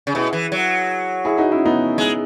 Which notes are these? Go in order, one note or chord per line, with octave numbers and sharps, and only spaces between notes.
C#3
B2 E4 G#4
E3
F#3
E4 G#4
D#4 F#4
C#4 E4
B3 D#4
G#3